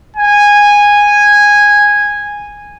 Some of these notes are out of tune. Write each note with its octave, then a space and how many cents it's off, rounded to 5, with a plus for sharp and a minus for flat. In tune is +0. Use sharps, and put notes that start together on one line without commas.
G#5 -10